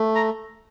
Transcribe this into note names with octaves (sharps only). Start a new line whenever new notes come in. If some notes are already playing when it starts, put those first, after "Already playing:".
Already playing: A3
A#5